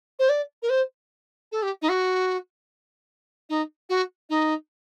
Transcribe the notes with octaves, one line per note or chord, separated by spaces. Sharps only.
C5
D5
A#4
C5
A4
G4
D#4
F#4
D#4
F#4
D#4